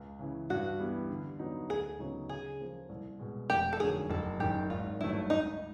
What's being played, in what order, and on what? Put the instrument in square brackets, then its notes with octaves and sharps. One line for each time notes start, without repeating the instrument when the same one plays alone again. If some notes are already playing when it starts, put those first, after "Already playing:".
Already playing: [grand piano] C#2
C#3 E3
[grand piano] G2 [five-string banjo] F#4
[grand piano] E3 G3 B3
D3
F#3 B3 D#4 F#4
[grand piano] D2 [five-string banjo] G#4
[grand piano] C#3 F#3 B3 D#4
[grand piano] C#3 [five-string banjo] G#4
[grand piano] F3 A#3
C2
B2 G#3
[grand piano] F1 [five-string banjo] G4
[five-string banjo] A4
[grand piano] D#2 D3 F#3 [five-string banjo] G#4
[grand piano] F#1 [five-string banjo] A4
[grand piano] F#2 D#3 [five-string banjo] G4
[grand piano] G#1 [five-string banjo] F4
[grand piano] G2 D#3 F#3 A3 [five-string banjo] E4
[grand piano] C#2 [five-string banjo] D#4